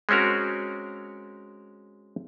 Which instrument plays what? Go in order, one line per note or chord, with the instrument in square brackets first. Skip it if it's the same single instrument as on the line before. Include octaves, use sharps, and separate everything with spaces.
[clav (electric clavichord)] G#3 C4 C#4 F#4 A#4